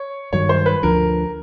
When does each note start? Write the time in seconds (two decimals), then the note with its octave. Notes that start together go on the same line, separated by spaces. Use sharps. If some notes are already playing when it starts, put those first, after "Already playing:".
Already playing: C#5
0.33 G2 D#3 F#3 C#5
0.49 C5
0.66 B4
0.83 D2 D3 F3 A#4